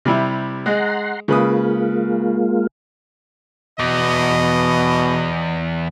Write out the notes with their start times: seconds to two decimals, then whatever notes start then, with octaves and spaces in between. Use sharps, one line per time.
0.05 C3 G3 E4
0.66 G#3 F#5 A#5 C6
1.28 C#3 G#3 A#3 F4 B4 D#6
3.79 E2 B2 D#5